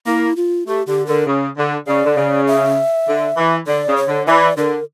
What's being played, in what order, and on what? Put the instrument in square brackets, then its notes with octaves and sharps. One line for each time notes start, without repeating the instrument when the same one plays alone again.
[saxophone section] A#3 [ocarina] E4
[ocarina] F4
[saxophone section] A3 [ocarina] G4
[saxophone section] D3 [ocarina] G4
[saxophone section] D3 [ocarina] A#4
[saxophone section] C#3
D3
[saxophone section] C#3 [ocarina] D5
[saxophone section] D3
C#3
[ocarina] E5
[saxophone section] D3
E3
[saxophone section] D3 [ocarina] D5
[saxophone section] C#3
[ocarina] C#5
[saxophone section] D3
[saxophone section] E3 [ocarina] E5
[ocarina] D5
[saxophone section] D3 [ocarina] A#4